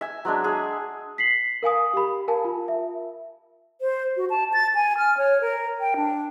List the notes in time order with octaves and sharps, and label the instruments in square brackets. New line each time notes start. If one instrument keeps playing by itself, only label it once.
[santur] E5 G#5
F#3 G#3 D4
G#4
[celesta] B6 C7 F#7
A#4 F5 G#5 D#6
G4 B5
A#4 F5 G#5 A5
F4
E5
[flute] C5
F#4
A5
A6
G#5
F6
C#5
A#4
G5
D4